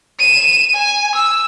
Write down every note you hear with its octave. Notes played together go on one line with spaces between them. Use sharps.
D#7 E7
G#5
E6